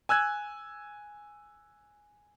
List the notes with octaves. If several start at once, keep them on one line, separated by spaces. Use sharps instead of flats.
G#5 E6 F#6 G#6